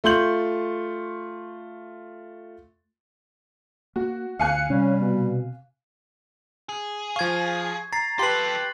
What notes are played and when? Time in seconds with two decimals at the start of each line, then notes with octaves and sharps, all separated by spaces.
0.04 A3 F4 C6 G6 F#7
3.96 A#3 F#4
4.39 D2 F5 G#5 F#6 C#7
4.70 C3 G3 C#4
5.00 B2
6.69 G#4
7.16 F3 F5 C#6 G#6
7.93 A#5 A6 C7
8.19 F4 G4 A4 B4 C6 C7 F#7